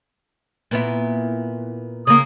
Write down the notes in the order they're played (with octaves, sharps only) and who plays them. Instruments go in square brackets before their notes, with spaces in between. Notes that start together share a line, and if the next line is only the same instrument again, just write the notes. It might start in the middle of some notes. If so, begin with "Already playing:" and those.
[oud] A#2 B3 E4
[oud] C#3 A#3 [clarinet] D#6